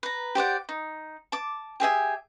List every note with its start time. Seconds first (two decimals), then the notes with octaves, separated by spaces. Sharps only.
0.03 B4 A#5
0.35 G4 C5 D5 F#5
0.69 D#4
1.32 A5 D6
1.80 G4 G#4 E5 G#5